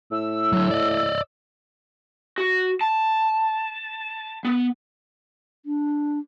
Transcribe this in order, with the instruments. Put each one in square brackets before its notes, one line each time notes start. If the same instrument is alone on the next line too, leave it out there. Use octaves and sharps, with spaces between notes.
[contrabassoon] A2 [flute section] E6
[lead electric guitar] D3 F#3
D5 D#5
[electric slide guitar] F#4
A5
B3
[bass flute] D4